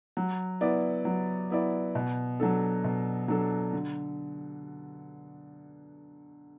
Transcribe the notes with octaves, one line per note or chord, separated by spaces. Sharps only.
F#3
B3 E4 D5
F#3
B3 E4 D5
B2
F#3 D4 A4
B2
F#3 D4 A4
D3